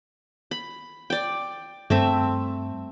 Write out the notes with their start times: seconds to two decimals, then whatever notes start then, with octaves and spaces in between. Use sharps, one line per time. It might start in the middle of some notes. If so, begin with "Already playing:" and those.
0.51 B5
1.10 D5 G5
1.90 G2 A3 C4 E5